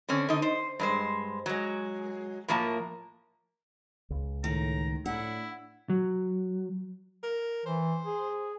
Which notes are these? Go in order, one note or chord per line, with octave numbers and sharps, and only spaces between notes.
D3 C4 C#4
D3 D#4
C5
G2 G#3 C5
F#3 G#3
A2 F3 A#3 A5
C#2
A2 D#3 A#5
A2 D4 E4 F#5
F#3
A#4
E3 C5
G#4